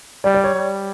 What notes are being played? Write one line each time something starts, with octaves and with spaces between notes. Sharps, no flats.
G3 D5
D5
C#5
G3